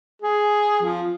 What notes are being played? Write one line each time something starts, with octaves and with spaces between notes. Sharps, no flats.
G#4
F3